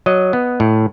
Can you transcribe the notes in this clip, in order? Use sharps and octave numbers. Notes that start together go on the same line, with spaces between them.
F#3 D#5
B3
A2